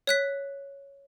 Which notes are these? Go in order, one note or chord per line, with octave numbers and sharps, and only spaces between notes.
C#5 F#6 B6